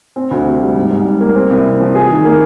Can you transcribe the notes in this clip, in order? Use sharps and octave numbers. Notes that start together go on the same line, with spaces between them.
C4
D2
C3
G3
G#2
G#2
G3
A#3
C4
C2
C3
F3
G#4
D#3
A#3